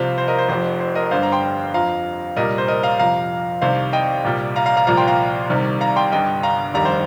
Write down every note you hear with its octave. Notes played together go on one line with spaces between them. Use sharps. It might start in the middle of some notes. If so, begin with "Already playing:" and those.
Already playing: C2 C3 F3 C5 F5
C5
A#4 D#5
C5
F1 F2 F3 C5
C5
A#4 D#5
G1 G2 G3 C5 F5
A#5
G5 C6
F2 F3 F5 A#5
C2 A#2 G3 A#4 D#5
C5
A#4 D#5
F5 A#5
F2 C3 F3 F5 A#5
C2 C3 D#3 C5 F5
D#5 G5
C2 A#2 G3
F5 A#5
F5 A#5
F5 A#5
C2 A#2 F3 F5 A#5
G5 C6
F5 A#5
C2 C3 D#3 G3
F5 A#5
G5 C6
G1 G2 G3 D#5 G5
F5 A#5
F1 D#2 D#3 G3 F5 A#5
C5 F5